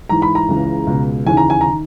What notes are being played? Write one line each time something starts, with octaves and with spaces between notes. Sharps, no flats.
G#2 E3 A#5
B5
A#5
C#2 C#3 E3
C#2 B2
D#2 C#3 E3 G#5
A#5
G#5
A#5
D#3